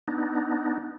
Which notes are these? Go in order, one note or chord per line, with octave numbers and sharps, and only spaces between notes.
B3 D4 D#4